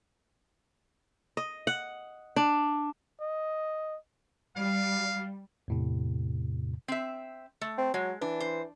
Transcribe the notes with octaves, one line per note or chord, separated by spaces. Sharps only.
D#5
F#5
D4
D#5
G3 F5
E2 A2 C3
C4 E5
A3
C4
F#3 G#3
E3 D4
C5